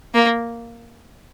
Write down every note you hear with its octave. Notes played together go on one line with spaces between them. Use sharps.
A#3